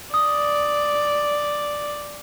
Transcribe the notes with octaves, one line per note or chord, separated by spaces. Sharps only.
D5 D#6